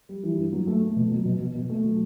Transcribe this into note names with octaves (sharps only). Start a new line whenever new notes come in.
G3
E3
G2
F#3
A3
A3
B2
F#3
B2
B2
B2
A3
F#3